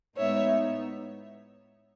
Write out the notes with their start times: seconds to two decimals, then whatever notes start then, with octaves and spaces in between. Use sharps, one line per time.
0.17 A2 G#3 B3 D#4 C#5 E5